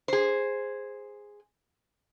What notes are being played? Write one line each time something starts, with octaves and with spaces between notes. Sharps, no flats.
G#4 C5